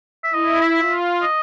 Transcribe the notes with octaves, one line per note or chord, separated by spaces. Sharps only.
E5
E4 D#5
E5
F4
D#5